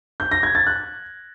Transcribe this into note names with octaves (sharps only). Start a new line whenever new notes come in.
G6
A#6
G#6
A6
F#6